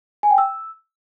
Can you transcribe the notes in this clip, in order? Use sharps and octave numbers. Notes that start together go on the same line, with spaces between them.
G#5
G5
E6